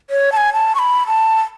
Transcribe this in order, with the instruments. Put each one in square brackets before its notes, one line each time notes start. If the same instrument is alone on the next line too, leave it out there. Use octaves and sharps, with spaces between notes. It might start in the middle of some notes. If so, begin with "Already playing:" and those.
[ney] C#5
A5
G#5
A5
C#6
B5
A5